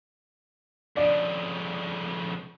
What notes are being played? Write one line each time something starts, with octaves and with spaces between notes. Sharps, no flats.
F2 C#3 D5